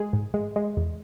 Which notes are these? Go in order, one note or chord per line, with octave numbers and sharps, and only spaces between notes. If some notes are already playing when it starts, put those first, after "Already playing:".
Already playing: G#3 G#4
G#2
G#3
G#3
E2